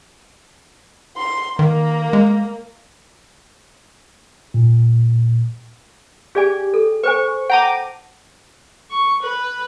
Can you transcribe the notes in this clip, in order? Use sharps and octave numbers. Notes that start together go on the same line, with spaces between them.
C6
D#3 A#3 A#4
G#3
A#2
G4 G#4 D5 G#5
A4
B4 C5 G#5 C#6
F#5 G5 A5 A#5 D6
C#6
B4